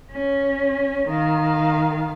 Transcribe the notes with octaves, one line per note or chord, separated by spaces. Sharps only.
C#4
D#3 F5